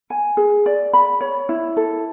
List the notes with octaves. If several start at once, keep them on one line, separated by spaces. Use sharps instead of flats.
G#5
G#4
D5
B5
C#5
E4
A4